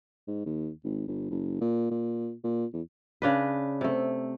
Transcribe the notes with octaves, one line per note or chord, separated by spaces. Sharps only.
G#2
D#2
G#1
G1
F#1
A#2
A#2
A#2
E2
C#3 D4 B4
C3 A3